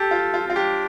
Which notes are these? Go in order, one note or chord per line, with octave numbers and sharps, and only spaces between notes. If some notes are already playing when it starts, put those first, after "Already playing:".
Already playing: G4 A4
F4
F4
C4 F4
D4 G4